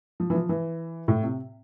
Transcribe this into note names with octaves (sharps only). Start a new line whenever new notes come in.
F3
E3
F3
E3
A2
C3